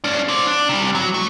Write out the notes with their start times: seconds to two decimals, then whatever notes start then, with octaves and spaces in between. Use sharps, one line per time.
0.04 C#4 D4
0.28 C5 D5
0.47 D4
0.69 C3 G3
0.95 F#3
1.14 A3